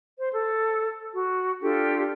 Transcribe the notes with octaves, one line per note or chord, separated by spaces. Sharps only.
C5
A4
F#4
D4 F4 G4 A4